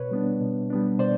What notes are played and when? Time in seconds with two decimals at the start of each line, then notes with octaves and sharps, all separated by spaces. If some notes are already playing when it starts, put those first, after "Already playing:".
Already playing: B2 B4 C#5
0.11 G3 B3 D4
0.41 B2
0.70 G3 B3 D4
0.99 B2 C5 D5